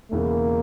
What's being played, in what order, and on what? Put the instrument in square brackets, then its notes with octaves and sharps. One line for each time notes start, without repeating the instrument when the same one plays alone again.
[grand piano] E1 E2 C#3 E3 [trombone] A#3